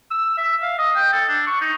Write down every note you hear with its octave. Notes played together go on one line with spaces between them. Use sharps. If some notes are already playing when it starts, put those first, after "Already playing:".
E6
E5
F5
D#5
G5
A4
D4
C#6
D#4